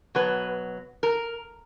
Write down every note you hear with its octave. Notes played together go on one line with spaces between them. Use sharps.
B2 F#3 B4
A#4